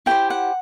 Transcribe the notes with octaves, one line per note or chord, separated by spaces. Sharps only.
E4 G4 C5 G5
F#5